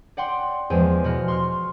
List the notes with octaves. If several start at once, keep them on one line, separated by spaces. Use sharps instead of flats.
D5 F#5 G5 C6
E2 F3 G#3
B2 F#4 F6
C6 C#6 F6